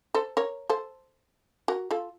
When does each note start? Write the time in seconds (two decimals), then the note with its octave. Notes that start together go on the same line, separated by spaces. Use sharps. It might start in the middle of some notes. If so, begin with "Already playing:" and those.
0.14 A4 C5
0.37 A#4 C#5
0.70 A4 C5
1.68 F#4 A#4
1.91 F4 A4